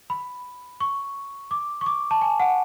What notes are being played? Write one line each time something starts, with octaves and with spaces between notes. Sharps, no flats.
B5
C#6
D6
C#6
D6
A5
G#5
F#5